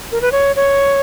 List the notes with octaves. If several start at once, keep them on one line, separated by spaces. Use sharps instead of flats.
A#4
B4
C#5
C#5